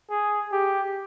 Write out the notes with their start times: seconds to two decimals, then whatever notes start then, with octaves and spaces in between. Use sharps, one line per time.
0.10 G#4
0.52 G4